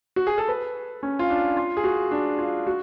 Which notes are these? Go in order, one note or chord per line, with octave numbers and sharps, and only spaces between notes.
F#4
G#4
A4
B4
C#4
F4
D4
F4
G#4
F#4
D4
F4
F#4